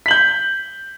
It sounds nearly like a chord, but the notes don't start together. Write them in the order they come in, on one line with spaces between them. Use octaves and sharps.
B6 F#7 G6